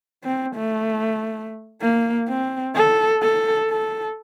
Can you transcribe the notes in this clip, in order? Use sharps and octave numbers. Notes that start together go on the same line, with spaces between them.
C4
A3
A#3
C4
A4
A4
A4